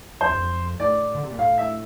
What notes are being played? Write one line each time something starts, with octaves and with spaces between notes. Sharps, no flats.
F2 C5
E2
F2
A2 D5
D3
C3
A#2
A2 F5
E5